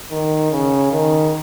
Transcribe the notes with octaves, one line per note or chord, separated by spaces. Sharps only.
D#3
C#3
D#3